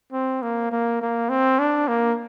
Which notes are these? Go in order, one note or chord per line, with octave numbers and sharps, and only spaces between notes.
C4
A#3
A#3
A#3
C4
D4
A#3